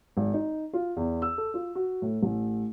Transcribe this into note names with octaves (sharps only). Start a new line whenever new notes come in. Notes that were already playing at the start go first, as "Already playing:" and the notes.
G#1
D#4
F4
E2
E6
A4
F4
F#4
A2
A1